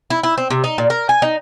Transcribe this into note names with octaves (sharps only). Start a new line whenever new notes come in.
E4
E4
C4
C3
D#4
A#2
A#4
G#5
D#4